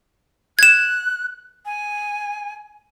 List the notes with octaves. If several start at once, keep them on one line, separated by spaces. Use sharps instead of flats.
F#6 G#6 E7
G#5